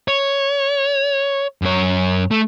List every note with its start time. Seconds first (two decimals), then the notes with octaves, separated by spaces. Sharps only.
0.08 C#5
1.62 F#2 C#5
2.31 A3